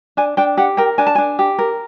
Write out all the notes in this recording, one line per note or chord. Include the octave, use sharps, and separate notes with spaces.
D4 G#5
D4 G5
G4 F#5
A#4 G5
D4 G#5
A5
D4 G#5
G4
A#4